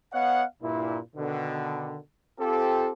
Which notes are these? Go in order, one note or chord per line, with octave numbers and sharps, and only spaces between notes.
B3 C#5 D#5 F5 F#5
G2 A#2 E4
B2 D3 D#3
C4 F4 G4 A4